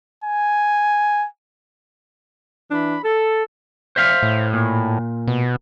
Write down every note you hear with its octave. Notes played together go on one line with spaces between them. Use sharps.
G#5
E3 D4 B5
A4
C5 E5 F5
A2
A#2
B2